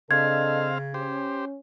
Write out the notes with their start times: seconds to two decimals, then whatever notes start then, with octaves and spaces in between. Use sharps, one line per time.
0.11 C#3 C4 D4 A4 D#5 F5 G#6
0.94 C#4 G4 C5